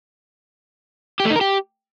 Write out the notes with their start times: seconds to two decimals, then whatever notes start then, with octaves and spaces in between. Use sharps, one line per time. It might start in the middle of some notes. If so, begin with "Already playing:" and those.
1.20 G4
1.25 A3
1.30 D#4
1.36 A#4
1.41 G4